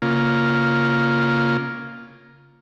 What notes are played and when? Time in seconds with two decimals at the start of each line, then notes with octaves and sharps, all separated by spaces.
0.02 C#3 A#3 F4